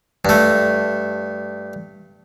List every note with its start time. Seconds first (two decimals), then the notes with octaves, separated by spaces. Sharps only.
0.25 G2 A3